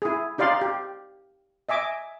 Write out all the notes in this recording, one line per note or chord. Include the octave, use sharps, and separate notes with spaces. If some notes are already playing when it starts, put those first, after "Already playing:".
E4 G#4
D#4 G4 D5 F5 C6
G4
D#5 E5 G#5 D6